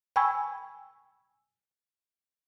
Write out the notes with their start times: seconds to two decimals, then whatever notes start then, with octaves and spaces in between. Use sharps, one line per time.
0.16 G5 G#5 B5 C#6 E6 G#6